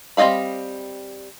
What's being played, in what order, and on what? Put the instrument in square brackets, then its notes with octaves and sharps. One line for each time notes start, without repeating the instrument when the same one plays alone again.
[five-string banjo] G3 C4 D#5 F5 B5